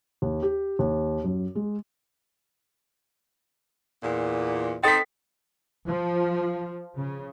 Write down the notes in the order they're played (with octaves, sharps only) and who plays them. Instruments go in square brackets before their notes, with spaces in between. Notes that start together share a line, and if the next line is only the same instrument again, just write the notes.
[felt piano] D#2
G4
D#2
F#2
G#3
[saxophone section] E2 A#2
[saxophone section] C4 D#4 [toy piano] A4 G5 [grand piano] A6 B6
[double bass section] F3
C#3